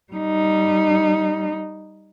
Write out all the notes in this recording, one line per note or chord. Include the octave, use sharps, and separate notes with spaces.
G3 D#4